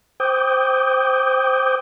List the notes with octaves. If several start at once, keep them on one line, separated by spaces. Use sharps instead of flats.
C5 G5 D6 D#6 G6